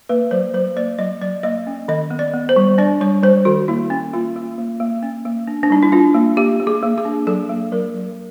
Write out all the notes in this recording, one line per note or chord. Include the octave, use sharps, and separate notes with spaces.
A#3 B4
F#3 C5
F#3 C5
A#3 D5
F#3 D#5
F#3 D5
A#3 D#5
C#4
D#3 D#5
B3
D5
B3
C5
G3
D4 D5
G3 C#5
G3 C5
D#3 F#4
A#3 E4
C#4
A#3 F4
A#3
A#3
A#3
C#4
A#3
D4
D4
G3 D#4
E4
D4 F4
A#3
A#3 G4
A#3
G#4
A#3
G#4
D4
F#3 A4
A#3
F#3 A#4
F#3